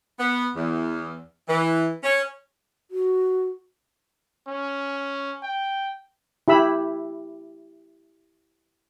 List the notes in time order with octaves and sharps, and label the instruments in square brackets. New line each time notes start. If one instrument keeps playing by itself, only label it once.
[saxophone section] B3
E2
E3
C#4
[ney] F#4
[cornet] C#4
G5
[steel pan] E4 G4 B5 E6